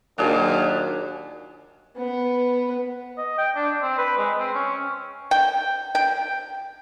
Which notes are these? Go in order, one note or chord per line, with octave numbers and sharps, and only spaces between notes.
D#2 A#2 F#3 D4 G#4
B3 B4
D#5
G5
D4
C4
B4
G#3
C4
C#4
G5
G5